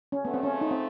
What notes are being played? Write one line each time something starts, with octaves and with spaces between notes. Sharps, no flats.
C#4
F2 C#3 F3 A3 B3
C4
C#4
D#4
C4